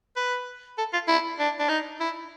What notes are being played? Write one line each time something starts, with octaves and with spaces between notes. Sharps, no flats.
B4
A4
F4
E4
D4
D4
D#4
E4